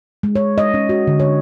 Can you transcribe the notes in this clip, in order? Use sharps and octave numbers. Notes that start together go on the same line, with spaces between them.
G#3
C#5
D#5
C#4
F#4
D3
C#5